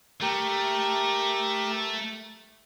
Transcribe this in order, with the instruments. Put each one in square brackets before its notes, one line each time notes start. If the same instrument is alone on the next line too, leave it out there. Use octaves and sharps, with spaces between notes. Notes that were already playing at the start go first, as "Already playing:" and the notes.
[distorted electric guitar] A3 [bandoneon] G4 A#4